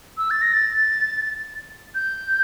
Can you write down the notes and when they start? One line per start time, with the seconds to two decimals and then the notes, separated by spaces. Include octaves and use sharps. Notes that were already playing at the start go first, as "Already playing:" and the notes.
0.18 E6
0.31 A6
0.42 A#6
0.54 A6
1.95 G6